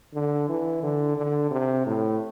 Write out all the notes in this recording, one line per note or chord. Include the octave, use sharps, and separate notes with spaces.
D3
E3
D3
D3
C3
A2